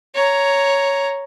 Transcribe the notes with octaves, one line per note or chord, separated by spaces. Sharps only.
C#5 A#5